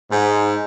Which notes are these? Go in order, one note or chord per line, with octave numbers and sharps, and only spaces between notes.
G#2